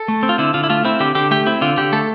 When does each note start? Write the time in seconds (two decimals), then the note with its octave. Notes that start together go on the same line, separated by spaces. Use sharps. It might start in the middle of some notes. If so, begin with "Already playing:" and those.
Already playing: A4
0.08 A3
0.23 C4
0.29 F4
0.38 D3 E4
0.54 D3 F4
0.64 E4
0.69 A3 F4
0.85 C4 E4
1.00 D3 G4
1.15 D3 G4
1.31 A3 G4
1.47 C4 E4
1.61 D3 F4
1.77 D3 G4
1.92 A3 A4